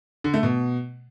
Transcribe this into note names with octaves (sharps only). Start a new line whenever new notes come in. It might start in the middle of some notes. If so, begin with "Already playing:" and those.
D3
A3
B2